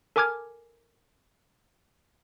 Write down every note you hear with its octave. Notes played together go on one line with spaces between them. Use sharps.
A4 A#4 G#5 D6 F6 G#6